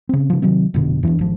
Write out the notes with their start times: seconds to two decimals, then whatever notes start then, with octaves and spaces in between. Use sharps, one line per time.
0.09 C#3 C4
0.30 C#3 F3
0.42 C3 D#3 F#3 C4
0.74 F1 B2 D3
1.03 E2 E3 C4 D4
1.19 G#1 F3